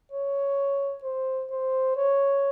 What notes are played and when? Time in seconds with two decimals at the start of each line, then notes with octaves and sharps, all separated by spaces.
0.12 C#5
1.04 C5
1.50 C5
1.96 C#5